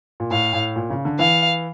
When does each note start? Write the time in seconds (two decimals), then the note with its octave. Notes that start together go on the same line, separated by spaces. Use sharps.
0.20 A#2
0.31 A2 F5
0.53 A2
0.76 A#2
0.90 C#3
1.05 D3
1.19 E3 F5